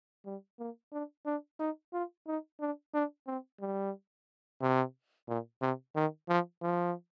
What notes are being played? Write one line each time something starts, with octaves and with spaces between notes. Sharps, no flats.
G3
A#3
D4
D4
D#4
F4
D#4
D4
D4
C4
G3
C3
A#2
C3
D#3
F3
F3